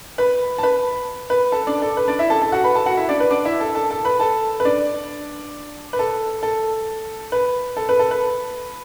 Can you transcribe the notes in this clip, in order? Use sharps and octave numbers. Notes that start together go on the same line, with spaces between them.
B4 B5
A5
B4 B5
B4
A4 A5
D4 D5
A4
B4
D4 D5
E4 E5
A4 A5
A4 A5
F#4 F#5
B4 B5
A4 A5
F#4 F#5
E4 E5
D4 D5
B4
D4 D5
E4 E5
A4 A5
A4 A5
A4 A5
B4 B5
A4 A5
B4
D4 D5
B4
A4
A4
B4
A4
B4
A4
B4